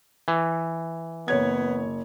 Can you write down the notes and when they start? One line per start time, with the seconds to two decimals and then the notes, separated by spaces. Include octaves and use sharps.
0.28 E3
1.28 F#1 B3 C#5 G#6